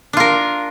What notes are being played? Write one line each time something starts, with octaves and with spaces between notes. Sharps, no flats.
D4 F4 A#4